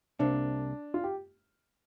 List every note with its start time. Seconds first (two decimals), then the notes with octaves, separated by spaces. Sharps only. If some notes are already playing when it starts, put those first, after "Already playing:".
0.19 C2 C3 A#3 D4
0.94 F4
1.04 G4